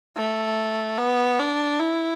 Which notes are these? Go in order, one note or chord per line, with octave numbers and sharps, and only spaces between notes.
A3
B3
D4
E4